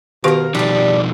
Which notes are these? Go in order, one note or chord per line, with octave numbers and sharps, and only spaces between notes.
B2 D#3 G4 A#4 F5 C#6
B2 F3 G3 D4 D#4 D5